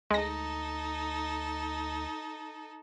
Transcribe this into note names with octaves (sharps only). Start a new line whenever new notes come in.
D2 G#3 D#4 A4 A#6